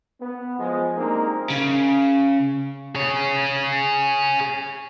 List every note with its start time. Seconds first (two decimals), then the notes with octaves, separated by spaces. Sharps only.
0.20 B3
0.58 F3 G#3
0.97 G3 G#3 A#3 C4 D4 D#4
1.50 C#3
2.95 G#4 C#5